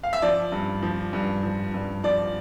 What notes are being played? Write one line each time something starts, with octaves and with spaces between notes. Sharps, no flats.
F5
E5
F3 D5
G2
F3
G2
F3
G2
F3 D5